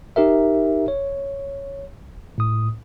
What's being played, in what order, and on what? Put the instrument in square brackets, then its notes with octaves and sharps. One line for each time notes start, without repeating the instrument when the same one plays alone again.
[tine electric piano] D#4 G4 A#4 E5
C#5
A2 D#6